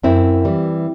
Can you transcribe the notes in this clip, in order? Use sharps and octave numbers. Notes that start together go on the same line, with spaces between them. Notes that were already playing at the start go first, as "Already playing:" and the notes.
F#2 C4 E4
E3 G3